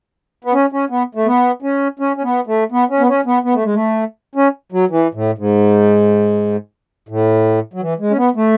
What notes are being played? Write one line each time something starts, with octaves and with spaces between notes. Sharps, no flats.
B3
C#4
C#4
B3
A3
B3
C#4
C#4
C#4
B3
A3
B3
C#4
B3
C#4
B3
B3
A3
G#3
A3
C#4
F#3
E3
A2
G#2
A2
F#3
E3
G#3
C#4
B3
A3